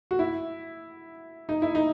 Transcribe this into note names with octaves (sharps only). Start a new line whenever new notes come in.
F#4
E4
D#4
E4
D#4